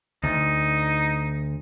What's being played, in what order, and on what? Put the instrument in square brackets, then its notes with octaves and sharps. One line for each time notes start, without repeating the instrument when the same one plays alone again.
[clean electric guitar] D2 [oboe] D#4